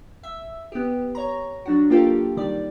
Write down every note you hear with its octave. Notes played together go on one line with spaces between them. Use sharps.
E5
B3 G4
C#5 A#5
F#3 D4 F#4
A#3 F4 G4 A4 A#4
D#3 G3 D5